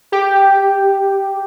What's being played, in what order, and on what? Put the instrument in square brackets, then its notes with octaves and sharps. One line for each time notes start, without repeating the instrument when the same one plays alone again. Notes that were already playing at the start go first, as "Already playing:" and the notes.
[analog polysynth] G4